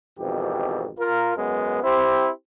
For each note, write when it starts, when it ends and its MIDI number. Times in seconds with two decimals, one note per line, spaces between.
0.19 0.89 32
0.19 0.89 41
0.19 0.89 47
0.19 0.89 52
0.19 0.89 67
0.99 1.33 65
0.99 1.33 70
1.37 1.81 42
1.37 1.81 56
1.37 1.81 59
1.83 2.29 60
1.83 2.29 64
1.83 2.29 67
1.83 2.29 72